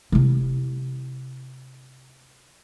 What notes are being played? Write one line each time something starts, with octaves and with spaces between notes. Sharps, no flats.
C3 E4